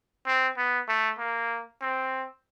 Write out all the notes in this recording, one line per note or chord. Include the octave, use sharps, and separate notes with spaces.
C4
B3
A3
A#3
C4